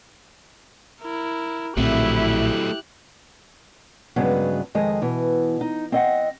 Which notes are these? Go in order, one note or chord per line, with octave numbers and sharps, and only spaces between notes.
E4 A#4
A#1 A2 F#3 A3 C4 E4 G4 F#6
G2 C#3 F#3 G#3 B3
F2 D#3 G#3 D#5
B2 E3
D#4
C4 D#5 F#5